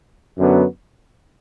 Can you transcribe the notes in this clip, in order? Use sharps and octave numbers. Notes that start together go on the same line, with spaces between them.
F#2 D3 F#3 B3